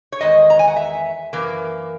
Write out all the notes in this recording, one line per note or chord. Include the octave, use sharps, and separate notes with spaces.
C#5
E2 D#3 G#3 D#5
A#5
G#5
F#5
E5
F#2 E3 A#3